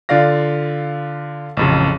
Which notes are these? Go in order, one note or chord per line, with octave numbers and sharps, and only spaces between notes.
D3 F4 D5 F5 A#6
A1 F2 C#3